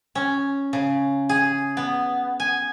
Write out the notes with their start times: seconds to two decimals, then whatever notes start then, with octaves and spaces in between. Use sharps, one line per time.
0.15 C#4
0.73 C#3
1.29 G#4
1.77 B3
2.40 G#5